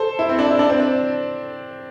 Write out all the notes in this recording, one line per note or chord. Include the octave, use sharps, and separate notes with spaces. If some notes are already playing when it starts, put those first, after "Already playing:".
Already playing: A4 C5
E4
C4
D4
E4
D4
C4
D4